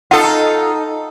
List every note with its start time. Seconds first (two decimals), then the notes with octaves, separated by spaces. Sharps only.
0.11 D#4 F4 A4 F#5